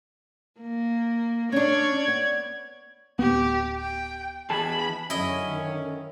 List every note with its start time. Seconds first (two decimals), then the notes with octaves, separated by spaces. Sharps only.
0.61 A#3
1.52 C#4 D4 C#5 D5 G#6
2.08 B3
3.19 D1 B3 G4
3.77 G5
4.50 E2 G#4 A5 B5
5.10 F#2 D3 F#3 C#4 E4 D#5
5.46 D#3